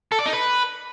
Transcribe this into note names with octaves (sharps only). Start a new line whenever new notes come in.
A4
D5
D#4
B4